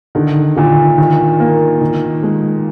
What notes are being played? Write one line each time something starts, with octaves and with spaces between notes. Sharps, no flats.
D3 D#3
A#2 D3
D#3
A#3
D#3
G#3